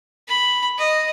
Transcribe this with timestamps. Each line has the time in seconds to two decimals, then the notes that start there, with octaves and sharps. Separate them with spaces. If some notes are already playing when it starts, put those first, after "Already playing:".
0.28 B5
0.78 D#5